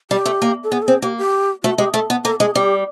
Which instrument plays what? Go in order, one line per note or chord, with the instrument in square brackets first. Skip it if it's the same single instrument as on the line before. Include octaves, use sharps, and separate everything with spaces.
[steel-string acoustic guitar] G3 [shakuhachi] G4
[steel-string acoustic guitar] A3
A#3
[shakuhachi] A4
[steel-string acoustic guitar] B3 [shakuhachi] G#4
[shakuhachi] A4
[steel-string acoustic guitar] C4 [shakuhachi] G#4
[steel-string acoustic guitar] A#3 [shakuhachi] G4
[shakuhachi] G4
[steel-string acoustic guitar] A3 [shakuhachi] F#4
[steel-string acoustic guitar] G#3 [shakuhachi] G4
[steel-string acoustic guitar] A3 [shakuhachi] A4
[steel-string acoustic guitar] B3
[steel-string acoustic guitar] A#3 [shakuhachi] A4
[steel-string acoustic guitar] G#3 [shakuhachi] G#4
[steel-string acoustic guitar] G3 [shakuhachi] G4